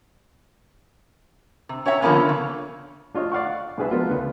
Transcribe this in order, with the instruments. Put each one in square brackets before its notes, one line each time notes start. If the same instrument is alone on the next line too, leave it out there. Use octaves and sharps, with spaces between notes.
[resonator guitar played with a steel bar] C3
C#4 C#5 E5 F5 A#5
D3 F3 G3 A#3 B3 C#4
C#3
[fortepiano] D4 F4 C#5 D#5
D5 F5 F#5 C#6
C2 D4 G#4 B4 E5
F3 G#3 A#3 B3 D4 F4
C#2 D3 B4